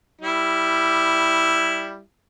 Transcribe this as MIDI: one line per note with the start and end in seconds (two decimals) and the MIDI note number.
0.22 1.99 55
0.22 1.99 64